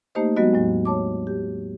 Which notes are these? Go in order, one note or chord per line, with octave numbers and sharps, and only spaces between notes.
A3 A#3 D#4 G4 C5 D#5
F#3 G#3 B3 F#4 D#5
E2 A2 F#3
C#5 A5 D6
G4